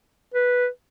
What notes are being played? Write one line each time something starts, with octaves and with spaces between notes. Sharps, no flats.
B4